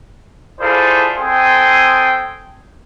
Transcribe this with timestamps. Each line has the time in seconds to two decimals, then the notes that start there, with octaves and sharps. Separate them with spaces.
0.60 E4 F4 G#4 A4 C5 D5
1.17 C4 A4 G5 G#5 C6 D#6